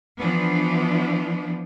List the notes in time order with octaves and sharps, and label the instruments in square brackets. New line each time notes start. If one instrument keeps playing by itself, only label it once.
[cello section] E3 F3 B3 D4